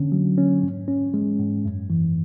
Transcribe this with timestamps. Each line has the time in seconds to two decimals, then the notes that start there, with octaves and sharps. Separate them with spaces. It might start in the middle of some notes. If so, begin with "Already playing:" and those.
Already playing: D3 C#4
0.12 F#3
0.38 C#4
0.62 G#2
0.88 C#4
1.14 G#3
1.39 G#2
1.65 F#2
1.90 E3